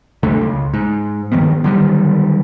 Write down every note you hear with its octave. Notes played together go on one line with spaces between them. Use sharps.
B1 F2 D3 A3
C#2
G#2
G2 D#3 F3 B3
D3 D#3 F#3 G3